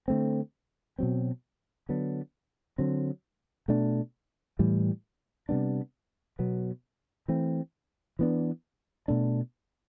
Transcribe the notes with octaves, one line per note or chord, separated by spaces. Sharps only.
D3 A3 C4
B2 F#3 C4
D3 F#3 B3 D4
D3 F#3 C4
B2 A3 D4
A2 E3 G3
C3 G3 B3 D4
B2 F#3 B3
E3 A3 C4
E3 B3 D4
B2 A3 D4